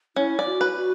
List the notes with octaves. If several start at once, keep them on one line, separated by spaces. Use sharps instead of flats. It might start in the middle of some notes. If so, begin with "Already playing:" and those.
C#4 E4
D5
F#4
B4
F#4